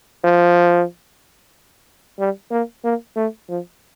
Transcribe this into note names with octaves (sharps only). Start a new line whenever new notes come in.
F3
G3
A#3
A#3
A3
F3